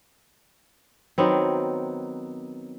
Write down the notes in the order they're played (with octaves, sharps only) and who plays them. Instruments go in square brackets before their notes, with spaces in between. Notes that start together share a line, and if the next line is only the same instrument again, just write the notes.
[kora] D#3 F#3 B3 C4